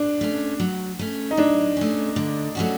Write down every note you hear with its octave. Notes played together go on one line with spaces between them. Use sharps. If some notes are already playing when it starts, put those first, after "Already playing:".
Already playing: D4
A3 C#4
F#3
A3 C#4
D#4
F#3 D4
A3 C#4
D3
F#3 A3 C#4 F#4